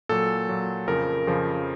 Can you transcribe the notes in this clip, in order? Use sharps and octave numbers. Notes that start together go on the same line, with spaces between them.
A#2 F#3 A4
A#2 F#3
F2 C#3 F3 A#4
F2 C#3 F3